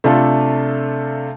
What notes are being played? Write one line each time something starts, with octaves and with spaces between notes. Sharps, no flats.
C3 A3 D4 F4 A4